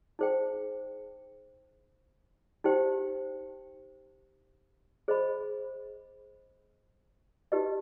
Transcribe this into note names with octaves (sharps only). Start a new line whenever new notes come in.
D#4 G#4 C5 G5
D#4 G4 C5 G5
G#4 C5 D#5 B5
D#4 G4 B4 D#5